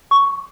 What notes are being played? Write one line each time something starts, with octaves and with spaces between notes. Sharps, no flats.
C#6